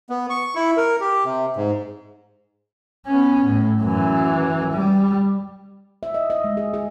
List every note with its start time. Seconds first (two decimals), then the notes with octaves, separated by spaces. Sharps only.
0.10 B3
0.30 C#6
0.55 E4
0.77 A#4
1.00 G4
1.24 C3
1.56 G#2
3.06 B3 C#4
3.45 A2
3.82 F#2 E3
4.73 G3
6.03 E5
6.14 D#5
6.30 D#5
6.44 G#3
6.57 G#4
6.74 G#4